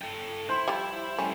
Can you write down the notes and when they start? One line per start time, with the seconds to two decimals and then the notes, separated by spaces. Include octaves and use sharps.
0.02 A4 G5
0.49 E4 C5
0.68 F3 G3
1.18 G3 A3 C#4